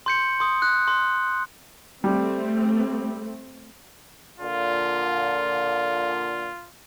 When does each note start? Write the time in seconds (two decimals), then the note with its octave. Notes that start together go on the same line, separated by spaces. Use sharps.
0.06 C6 G6 C#7
0.40 C6 D#6
0.62 F#6
0.88 C6
2.04 G3 A3 C4
4.40 A#2 D3 F4